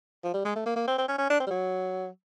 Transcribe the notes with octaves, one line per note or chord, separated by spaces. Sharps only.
F3
G3
G#3
A3
A#3
A#3
C4
C4
C#4
C#4
D4
C4
G3
F#3